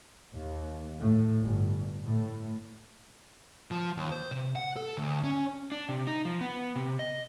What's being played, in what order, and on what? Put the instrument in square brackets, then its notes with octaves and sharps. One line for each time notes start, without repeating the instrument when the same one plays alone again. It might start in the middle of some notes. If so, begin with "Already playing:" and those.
[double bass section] D#2
A2
G1
A2
[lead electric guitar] F3
D#2
C5
C3
F#5
A4
D2
C#4
[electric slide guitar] D4
C3
D#4
F3
B3
C3
D#5